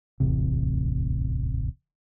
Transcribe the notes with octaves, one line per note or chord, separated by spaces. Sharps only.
D1 A1 E2 C3